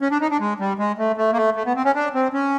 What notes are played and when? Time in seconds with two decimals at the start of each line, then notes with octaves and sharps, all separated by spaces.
0.01 C#4
0.11 D4
0.21 D#4
0.31 D4
0.40 G#3
0.60 G3
0.79 G#3
0.98 A3
1.17 A3
1.33 A#3
1.37 A3
1.56 A3
1.66 B3
1.76 C4
1.85 C#4
1.95 D4
2.14 C4
2.34 C#4